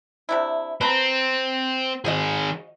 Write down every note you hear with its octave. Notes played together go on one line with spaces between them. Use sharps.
C3 D4 E4
C4 B4 A5 A#5
D#3 F3 F#4 G#4 D#5